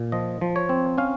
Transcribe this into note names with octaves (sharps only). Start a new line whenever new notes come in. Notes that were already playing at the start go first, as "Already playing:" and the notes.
Already playing: A#2
F3 D#5
F3
C#5
C4
C#4 F5